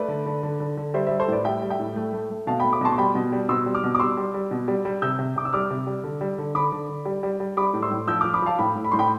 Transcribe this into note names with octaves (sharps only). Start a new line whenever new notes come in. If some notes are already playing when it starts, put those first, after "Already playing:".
Already playing: A3 B4 D5
D3
D3
D3
D3
D3
G3 C5 E5
C5 E5
G3
A4 C5
A2 B4 D5
G3 E5 G5
G3
E5 G5
A2
A3
A3
A3
B2 F5 A5
G5 B5
A3
B5 D6
B2 A5 C6
C6
G3 G5 B5
B2
G3
B2 C6 E6
G3
D6 F6
B2
D6
G3 C6 E6
G3
G3
B2
G3
G3
C3 E6 G6
C3
C3 D6
E6
G3 D6 F6
C3
G3
D3
G3
D3
D3 B5 D6
D3
D3
G3
G3
G3
G3 B5 D6
A2
C6 E6
A2
F3 E6 G6
F3 D6 F6
B5 D6
F3 F5 A5
A2 G5 B5
A2
B5
A2 C6
G5 B5